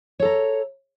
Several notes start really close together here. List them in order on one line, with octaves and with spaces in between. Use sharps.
C#5 A4 A#5